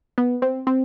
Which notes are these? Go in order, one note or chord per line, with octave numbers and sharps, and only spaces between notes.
B3
C4
C4